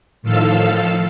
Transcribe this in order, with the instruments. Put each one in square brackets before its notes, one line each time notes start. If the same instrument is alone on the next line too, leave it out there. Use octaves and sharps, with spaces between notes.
[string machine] A2 D#3 F3 A4 F5 E6